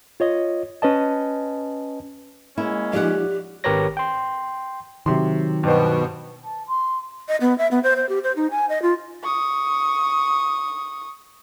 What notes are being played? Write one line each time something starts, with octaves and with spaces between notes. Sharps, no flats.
F4 C#5 D#5
C#4 B4 D#5 A5
G#3 A#3 C#4 E4
F3 D#4 F4 G4 D5 F#5
G#1 G4 A#4 B4 C#5 A#6
G5 C6
C3 D#3 F#3 C6
G2 B2 C5
A5
C6
D#5
B3
E5
B3
C5
C5
G4
C5
D#4
G#5
D#5
F4
C#6 D#6